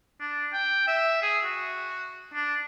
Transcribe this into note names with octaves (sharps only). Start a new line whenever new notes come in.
D4
G5
E5
G#4
F#4
D4